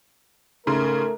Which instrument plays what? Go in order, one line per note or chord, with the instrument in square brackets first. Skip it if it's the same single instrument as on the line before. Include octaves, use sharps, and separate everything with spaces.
[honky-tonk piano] G#2 C#3 C6 [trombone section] A3 A#4